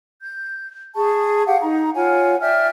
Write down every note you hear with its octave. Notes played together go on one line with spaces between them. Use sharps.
G6
G#4 A5 C#6
G4 F5 F#5
D#4 A#5
F4 C#5 F#5 G#5
D5 E5 G5 F6